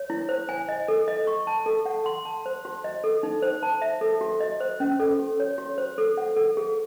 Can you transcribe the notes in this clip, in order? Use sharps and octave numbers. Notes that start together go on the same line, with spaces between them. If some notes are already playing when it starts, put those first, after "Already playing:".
Already playing: C#5
E4
C5
G#5
D#5
A4
D#5
C#6
A5
A4
F#5
C6
A5
C5
F#4
D#5
A4
D#4
C5
A5
E5
A4
F#4
D#5
C5
C#4
A4
F#4
C#5
F#4
C5
A4
F#5
A4
G#4